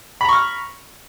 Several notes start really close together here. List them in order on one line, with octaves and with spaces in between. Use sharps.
B5 A#5 C#6 F6